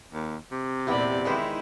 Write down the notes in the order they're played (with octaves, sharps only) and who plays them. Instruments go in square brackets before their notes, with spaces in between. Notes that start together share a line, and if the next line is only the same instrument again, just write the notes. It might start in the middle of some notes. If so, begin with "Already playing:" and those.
[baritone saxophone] D#2
C3
[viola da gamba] E2 A#2 D5 [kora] B3 E4 G4
[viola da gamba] D#3 D#4 E4 [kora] G#3 B4 C5